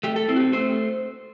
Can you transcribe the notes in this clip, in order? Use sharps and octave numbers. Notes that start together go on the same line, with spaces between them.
A3 G4
A4
C4 E4
F#4
G4
A3 C5